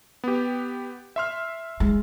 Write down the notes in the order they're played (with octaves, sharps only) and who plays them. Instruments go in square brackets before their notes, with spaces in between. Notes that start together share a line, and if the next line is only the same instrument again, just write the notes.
[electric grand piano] B3 G4
E5 C6 F6
[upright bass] G#3